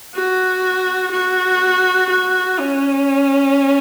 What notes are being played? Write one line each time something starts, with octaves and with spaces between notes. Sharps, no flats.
F#4
F#4
F#4
C#4